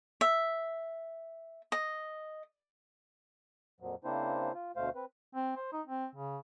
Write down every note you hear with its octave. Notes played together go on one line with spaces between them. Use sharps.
E5
D#5
F2 A#2 F3 F#3
C#3 A#3 C4 D4 E4 C5
F4
D2 B2 A3 C5 F5
C4 B4
C4
C5
D#4
C4
C#3